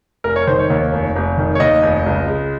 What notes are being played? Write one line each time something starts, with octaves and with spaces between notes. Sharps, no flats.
F1 A#4
C#5
D#3 C5
C#5
D#2
F1
F1
D#3
C#5
D#2 D#5
F1
C#2
G#3